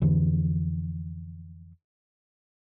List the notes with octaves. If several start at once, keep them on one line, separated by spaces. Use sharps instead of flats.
F2 D3 E3